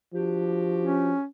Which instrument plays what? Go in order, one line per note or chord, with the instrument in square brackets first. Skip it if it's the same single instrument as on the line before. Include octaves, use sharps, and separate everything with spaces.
[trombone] F3 [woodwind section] D4 F#4 G4
[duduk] C#4